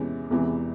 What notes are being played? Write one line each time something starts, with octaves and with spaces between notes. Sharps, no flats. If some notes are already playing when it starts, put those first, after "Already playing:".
Already playing: E2 C3 E3 G#3 C#4
E1 E2 C3 E3